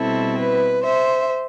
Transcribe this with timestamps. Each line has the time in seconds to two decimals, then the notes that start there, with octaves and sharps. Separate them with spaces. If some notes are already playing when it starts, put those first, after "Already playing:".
Already playing: B2 G3 C4 E4 A4
0.39 B4
0.84 C5 E5